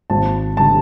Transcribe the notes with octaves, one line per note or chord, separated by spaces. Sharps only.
G#1 A5
D3 G3 A5